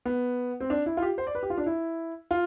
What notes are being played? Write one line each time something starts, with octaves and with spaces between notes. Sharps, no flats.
B3
C4
D4
E4
F4
G4
C5
D5
B4
G4
F4
D4
E4
F4